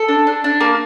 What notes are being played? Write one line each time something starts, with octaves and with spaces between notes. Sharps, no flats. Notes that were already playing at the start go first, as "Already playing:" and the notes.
Already playing: A4
D4
D4
D4
A#3